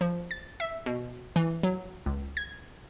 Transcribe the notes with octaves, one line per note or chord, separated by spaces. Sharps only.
F3
A6
E5
B2
E3
F#3
C#2
G#6